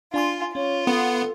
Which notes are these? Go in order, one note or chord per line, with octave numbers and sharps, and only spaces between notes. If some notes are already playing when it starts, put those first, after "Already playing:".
D4 F4 G#5 C6
C#4 F4 C#5
B3 A4